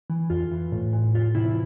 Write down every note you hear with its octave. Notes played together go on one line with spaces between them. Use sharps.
E3
F2 F4
E3
A2
E3
F2 F4
C3 E3 E4